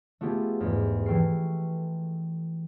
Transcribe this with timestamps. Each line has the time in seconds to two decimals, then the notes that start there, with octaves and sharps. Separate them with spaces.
0.21 A3 B3 F4 G4 G#4
0.60 E2 G#2 G4
1.06 E3 A4 G5 C#6 F6 C7